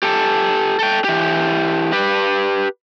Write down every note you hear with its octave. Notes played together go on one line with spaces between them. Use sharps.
G4 A4
A4 G5
E3 G4
G4 B4